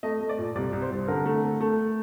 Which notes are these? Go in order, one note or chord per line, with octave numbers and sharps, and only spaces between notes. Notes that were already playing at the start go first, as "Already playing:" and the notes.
A3 D#5
A3
D5
A#2
C2 D5
C2
C5
C2
D3 A#4
A3
A3
A3